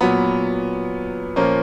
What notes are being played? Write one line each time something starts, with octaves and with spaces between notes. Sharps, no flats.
A#2 F#3 B3 B5
A#2 F3 A#3 C#4